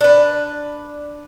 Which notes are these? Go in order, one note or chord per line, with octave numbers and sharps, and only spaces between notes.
D4 B4